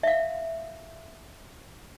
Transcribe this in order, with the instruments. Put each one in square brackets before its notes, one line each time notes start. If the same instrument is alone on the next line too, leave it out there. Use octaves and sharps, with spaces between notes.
[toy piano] E5 F5